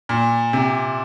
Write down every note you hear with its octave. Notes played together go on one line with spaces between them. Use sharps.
A#2
C3